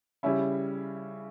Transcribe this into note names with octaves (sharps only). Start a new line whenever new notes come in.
C#3 G3 C#4 E4